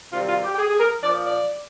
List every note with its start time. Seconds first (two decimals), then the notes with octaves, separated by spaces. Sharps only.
0.12 C3 D#3 G3 F4
0.28 F4
0.43 G4
0.53 G4
0.57 G#4
0.70 G#4
0.80 A#4
1.02 A#2 F3 D5
1.25 D5